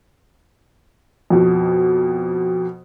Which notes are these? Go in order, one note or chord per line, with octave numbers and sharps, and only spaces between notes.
F2 B2